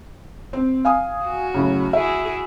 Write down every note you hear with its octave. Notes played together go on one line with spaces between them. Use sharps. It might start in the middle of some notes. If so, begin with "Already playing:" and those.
C4
F5 G#5 D#6
F#4
F#2 A2 C#3
E4 F#4 G#4 E5